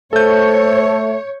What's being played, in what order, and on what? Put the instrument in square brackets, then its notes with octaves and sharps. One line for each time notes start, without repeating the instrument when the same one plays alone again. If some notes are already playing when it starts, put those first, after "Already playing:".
[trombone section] A3 [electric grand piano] A4 G6 [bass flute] C5 [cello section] C#5